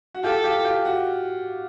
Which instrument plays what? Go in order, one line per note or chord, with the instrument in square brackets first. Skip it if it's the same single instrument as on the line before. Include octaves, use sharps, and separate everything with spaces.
[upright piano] F#4
[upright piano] F4 G4 [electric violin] A4
[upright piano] F4 G4
F4 G4
F#4